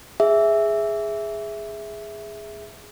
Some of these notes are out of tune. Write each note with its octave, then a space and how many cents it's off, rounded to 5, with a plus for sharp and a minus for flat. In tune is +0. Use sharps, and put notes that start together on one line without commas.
G#4 +0 E5 +0